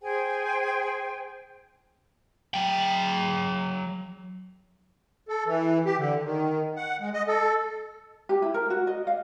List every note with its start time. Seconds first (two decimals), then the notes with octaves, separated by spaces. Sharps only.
0.02 G#4 C5 G5 G#5
2.54 F#3 G5
5.29 A4
5.46 E3
5.85 G4
5.97 D3
6.23 D#3
6.76 F#5
7.00 G#3
7.14 D#5
7.27 A4
8.29 G4
8.42 E4
8.54 A#4
8.70 F#4
8.87 D#5
9.07 F5